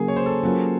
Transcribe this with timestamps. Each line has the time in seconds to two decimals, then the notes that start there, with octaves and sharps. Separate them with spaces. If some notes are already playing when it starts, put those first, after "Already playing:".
Already playing: C#3 F#3 A#3 G#4
0.08 C#5
0.16 C5
0.26 A4
0.43 F#3 A#3 C#4 F4